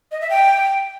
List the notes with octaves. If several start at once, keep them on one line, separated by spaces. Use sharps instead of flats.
D#5
E5
G5